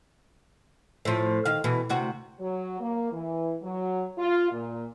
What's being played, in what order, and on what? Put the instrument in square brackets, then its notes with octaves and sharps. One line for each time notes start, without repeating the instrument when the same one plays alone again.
[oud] A2 F3
D#3 F5
B2 E3
D2 C3 F#4
[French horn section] F#3
A#3
E3
F#3
F4
A#2